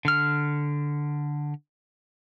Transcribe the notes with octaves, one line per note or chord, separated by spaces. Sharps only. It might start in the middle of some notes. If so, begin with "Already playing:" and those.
D3 F6